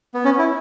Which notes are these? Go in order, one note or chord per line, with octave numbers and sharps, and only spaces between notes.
B3
C#4
E4